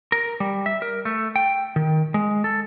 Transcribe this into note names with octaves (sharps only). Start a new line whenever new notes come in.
A#4
G3
E5
A#4
A3
G5
D#3
G#3
A4